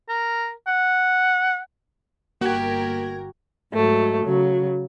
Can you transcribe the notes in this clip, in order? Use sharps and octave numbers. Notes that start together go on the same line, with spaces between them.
A#4
F#5
G1 A#3 F#4 G4 A#4 G#6
G#2 F#3 A3
C#3 F#3